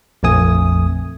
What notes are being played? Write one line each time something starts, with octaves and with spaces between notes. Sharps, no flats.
A#1 F2 A3 G#5 D#6